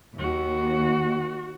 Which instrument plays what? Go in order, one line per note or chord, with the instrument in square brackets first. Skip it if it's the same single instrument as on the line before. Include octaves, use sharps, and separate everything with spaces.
[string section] D#2 [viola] F#4